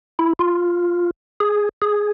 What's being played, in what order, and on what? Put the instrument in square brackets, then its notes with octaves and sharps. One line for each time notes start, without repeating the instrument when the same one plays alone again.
[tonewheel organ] E4
F4
G#4
G#4